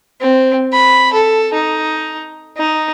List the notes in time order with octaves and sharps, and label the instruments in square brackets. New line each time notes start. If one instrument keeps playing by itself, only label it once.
[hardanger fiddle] C4
B5
A4
D#4
D#4